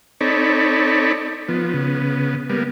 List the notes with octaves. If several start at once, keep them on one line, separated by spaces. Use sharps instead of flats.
C4 D#4 A4 C#5 D5 B5
F3 B3
C#3 B3
G3 A#3 B3